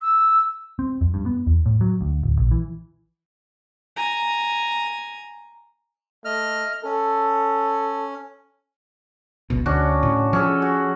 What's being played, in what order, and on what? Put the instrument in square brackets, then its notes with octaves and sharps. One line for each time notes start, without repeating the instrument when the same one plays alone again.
[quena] E6
[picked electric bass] C4
F2
G2
B3
E2
A2
F#3
D2
D1
A#1
E3
[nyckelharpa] G#5 A#5
[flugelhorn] A3 [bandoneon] D#5 F6
[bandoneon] C#4 [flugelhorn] A4
[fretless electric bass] G1 C#2 B2
[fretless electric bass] D2 [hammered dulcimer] C#4 D4 F#4
[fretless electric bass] A2 C#3
[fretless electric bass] F3 [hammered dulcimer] C#4 G#4 A4
[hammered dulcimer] F#4